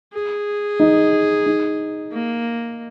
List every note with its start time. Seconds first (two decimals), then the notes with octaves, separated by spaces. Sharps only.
0.13 G#4
0.80 D#4
1.46 D#4
2.13 A#3